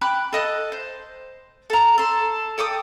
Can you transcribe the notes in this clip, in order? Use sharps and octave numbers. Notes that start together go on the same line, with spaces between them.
G5 B5 D6 F#6
A4 D#5 F#6
C5
A4 A#5
A4 C6
A4 G5 D6 D#6